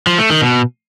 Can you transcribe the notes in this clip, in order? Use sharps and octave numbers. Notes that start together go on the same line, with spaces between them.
F3
A3
D#3
B2